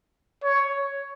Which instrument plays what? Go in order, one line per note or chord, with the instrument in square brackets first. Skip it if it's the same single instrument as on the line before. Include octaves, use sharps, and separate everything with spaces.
[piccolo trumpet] C#5